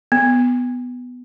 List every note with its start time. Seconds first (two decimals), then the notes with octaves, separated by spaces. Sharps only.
0.12 B3